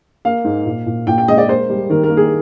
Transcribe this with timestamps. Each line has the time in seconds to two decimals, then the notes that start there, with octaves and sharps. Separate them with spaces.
0.25 A#3 F5
0.44 G#2
0.66 A#2
0.86 A#2
1.07 A#2 G5
1.18 G5
1.28 G#3 D#5
1.38 D5
1.48 A#3 C5
1.70 G3
1.90 D#3 A#4
2.04 A#4
2.10 A#3
2.17 G#4